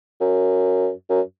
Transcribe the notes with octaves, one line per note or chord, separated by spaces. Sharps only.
F#2
F#2